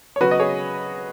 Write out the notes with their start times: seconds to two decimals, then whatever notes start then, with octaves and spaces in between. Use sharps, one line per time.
0.16 C#5
0.21 C#3 F#3 B3 F#4 B4
0.31 D#5
0.40 G#4 C#5